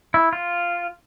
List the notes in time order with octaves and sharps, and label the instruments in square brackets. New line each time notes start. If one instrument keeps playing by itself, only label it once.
[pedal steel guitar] E4
F4